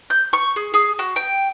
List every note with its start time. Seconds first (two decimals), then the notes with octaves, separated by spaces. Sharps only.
0.10 G6
0.33 C#6
0.56 G#4
0.74 G#4
0.99 F#4
1.16 G5